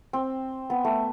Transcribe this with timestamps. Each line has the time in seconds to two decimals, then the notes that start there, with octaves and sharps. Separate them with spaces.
0.13 C4
0.70 B3
0.84 A3